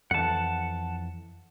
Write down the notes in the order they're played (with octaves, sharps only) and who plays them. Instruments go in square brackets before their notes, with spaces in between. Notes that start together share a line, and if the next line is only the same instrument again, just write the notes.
[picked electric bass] F2 E3 [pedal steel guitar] F#5 A5